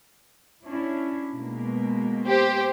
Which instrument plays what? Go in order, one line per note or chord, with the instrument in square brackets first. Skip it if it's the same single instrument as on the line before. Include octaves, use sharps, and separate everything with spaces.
[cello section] C#4 D4 E4
B2 G#3 A#3
[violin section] G4 C5